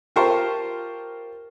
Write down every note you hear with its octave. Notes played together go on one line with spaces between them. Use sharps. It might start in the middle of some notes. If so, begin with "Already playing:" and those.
F4 G4 A#4 C5 A5 C#6